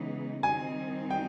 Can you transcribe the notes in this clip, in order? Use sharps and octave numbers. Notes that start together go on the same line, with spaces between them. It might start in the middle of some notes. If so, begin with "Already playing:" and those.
Already playing: C#3 E3 G#3 B3 D#4
D#3 G3 C4 D#4 G#5
G5